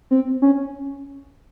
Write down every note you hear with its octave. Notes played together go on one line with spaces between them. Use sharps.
C4
C#4